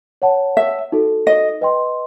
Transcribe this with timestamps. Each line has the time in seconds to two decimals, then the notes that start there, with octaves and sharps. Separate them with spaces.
0.22 C#5 F#5 A5
0.57 E5
0.92 D#4 F#4 A4
1.27 D#5
1.61 B4 D#5 G5 C6